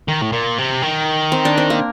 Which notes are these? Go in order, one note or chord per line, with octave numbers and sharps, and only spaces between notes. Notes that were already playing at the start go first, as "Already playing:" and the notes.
D#3
A2
A#2
C3
D#3
C4
D4
C4
A#3